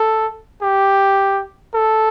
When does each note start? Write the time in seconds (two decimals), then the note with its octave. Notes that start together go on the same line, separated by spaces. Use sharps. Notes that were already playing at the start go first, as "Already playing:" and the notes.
Already playing: A4
0.62 G4
1.75 A4